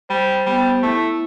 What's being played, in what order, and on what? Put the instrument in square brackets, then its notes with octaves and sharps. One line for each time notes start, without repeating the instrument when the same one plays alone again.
[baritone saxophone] G3 [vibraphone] C5
[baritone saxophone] G3 [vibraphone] B3
[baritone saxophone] A3 [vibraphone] E4